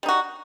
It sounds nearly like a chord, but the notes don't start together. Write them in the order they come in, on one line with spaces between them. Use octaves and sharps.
G3 D#4 F#4